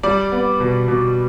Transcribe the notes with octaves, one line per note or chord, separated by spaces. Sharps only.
G3 D5
B3
B2
B2